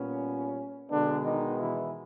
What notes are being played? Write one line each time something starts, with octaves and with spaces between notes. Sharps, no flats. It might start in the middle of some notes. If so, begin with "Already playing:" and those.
Already playing: A#2 G3 B3 C#4
B2 D3 G#3 B3 D4
D#3 D#4
E3 E4